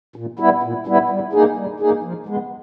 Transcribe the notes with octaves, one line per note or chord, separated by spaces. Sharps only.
A#2
G3 B3 E4
A#2
G3 B3 E4
G3
A#3 D#4 G#4
G3
A#3 D#4 G#4
F3
G#3 B3